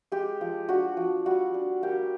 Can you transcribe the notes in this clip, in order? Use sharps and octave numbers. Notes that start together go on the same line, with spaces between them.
G#3 G4
F3
D4 F#4
F3
G3 F#4
D4
A#3 G4